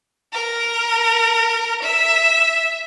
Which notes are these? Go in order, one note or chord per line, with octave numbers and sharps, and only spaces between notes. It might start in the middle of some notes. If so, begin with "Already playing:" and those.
A#4
E5